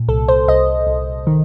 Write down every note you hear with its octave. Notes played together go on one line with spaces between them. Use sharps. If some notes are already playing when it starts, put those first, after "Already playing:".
Already playing: A#2
C2 A4
C5
C2 D#5
C2
D#3